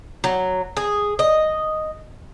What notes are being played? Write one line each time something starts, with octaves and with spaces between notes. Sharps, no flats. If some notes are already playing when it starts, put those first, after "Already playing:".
F#3
G#4
D#5